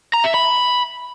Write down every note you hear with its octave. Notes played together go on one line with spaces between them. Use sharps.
A#5
E5
B5